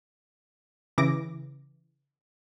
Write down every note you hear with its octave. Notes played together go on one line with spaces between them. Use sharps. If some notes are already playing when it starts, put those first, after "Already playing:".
C#3 E3 D6 A#6